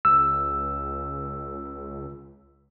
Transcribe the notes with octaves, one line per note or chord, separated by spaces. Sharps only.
C#2 E6